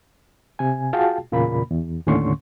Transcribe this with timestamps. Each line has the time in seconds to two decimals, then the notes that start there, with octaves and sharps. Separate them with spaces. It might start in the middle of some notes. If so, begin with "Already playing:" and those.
0.59 C3 G#5
0.93 F4 F#4 G#4 F5 G5 A5
1.32 E2 A#2 C#3 A#3 B5
1.71 E2
2.07 D#2 A2 D3 C#4 C6 C#6